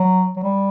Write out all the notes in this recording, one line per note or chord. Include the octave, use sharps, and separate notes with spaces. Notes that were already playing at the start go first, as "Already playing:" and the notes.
Already playing: F#3
F#3
G3